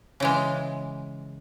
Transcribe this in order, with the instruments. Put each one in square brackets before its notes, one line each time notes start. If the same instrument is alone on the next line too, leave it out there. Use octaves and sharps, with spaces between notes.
[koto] C#3 E3 G#3